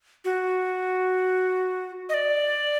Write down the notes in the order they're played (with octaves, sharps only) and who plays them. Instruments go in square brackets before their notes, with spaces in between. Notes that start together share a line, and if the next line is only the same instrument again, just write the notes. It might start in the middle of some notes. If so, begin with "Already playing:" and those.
[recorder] F#4
D#5
D5